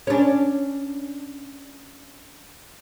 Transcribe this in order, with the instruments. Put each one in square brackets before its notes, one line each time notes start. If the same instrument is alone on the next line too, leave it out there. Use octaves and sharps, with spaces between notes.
[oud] C#4 D4